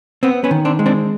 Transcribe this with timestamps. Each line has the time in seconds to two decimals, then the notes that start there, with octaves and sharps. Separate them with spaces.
0.23 B3 C4
0.44 B3 C#4
0.51 D#3
0.65 C4 D4
0.79 G#3
0.86 C4 D4